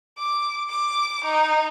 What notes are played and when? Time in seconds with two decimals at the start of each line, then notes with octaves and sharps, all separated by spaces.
0.18 D6
0.70 D6
1.24 D#4